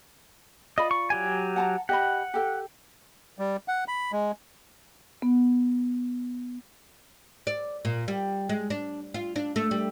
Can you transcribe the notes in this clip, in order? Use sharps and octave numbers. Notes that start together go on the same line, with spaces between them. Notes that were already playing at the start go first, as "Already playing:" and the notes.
F4 D5 D#5 B5
C#6
F#3 G4 G#5
F#5 A5 A#5
G4 D#5 F#5 B5
G4 A4 G5
G3
F#5
B5
G#3
B3
D5
A#2
G3
G#3
D4
F4
D4
A3
G3